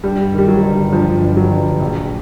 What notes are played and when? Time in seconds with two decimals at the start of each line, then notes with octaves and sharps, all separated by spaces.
0.04 G2 G3
0.33 D#3
0.39 G3
0.48 F#3
0.63 G1
0.92 G2 F3
1.21 G1
1.37 F#3
1.52 G1
1.81 A#1